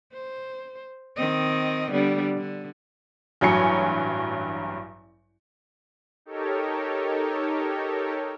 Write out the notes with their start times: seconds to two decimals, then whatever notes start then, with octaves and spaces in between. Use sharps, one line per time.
0.14 C5
1.17 D#3 C4 D#5
1.92 D3 G3 B3
2.37 D3
3.41 A1 G2 F#3 C#5 G#5 C#7
6.25 D#4 G4 A4 A#4 C#5